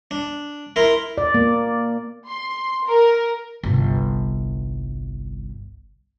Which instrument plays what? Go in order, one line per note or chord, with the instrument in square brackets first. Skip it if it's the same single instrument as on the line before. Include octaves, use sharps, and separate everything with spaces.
[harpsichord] D4
E4 A#4 C6
[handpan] D5
A#3
[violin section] C6
A#4
[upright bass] G1 C2